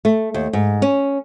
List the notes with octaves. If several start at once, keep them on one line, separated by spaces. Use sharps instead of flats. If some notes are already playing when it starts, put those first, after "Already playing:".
A3
D#2
G#2
C#4